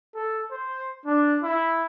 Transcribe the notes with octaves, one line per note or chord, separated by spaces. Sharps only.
A4
C5
D4
E4